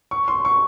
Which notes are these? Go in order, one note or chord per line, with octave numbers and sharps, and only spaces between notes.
C#6
C6
C#6